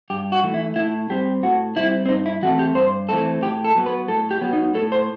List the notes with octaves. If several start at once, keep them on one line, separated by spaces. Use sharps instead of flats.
G2 G4
F#4
E3 A3
E4
A2 E4
G3 C4 G4
A2 F#4
G3 C4 E4
C4
G2 D#4
E4
E3 A3 C4 F#4
G4
G2 C5
E3 A3 C4 A4
A2 G4
A4
F#3 B3
B4
A2 A4
G4
F#3 B3
D#4
A2 A4
C5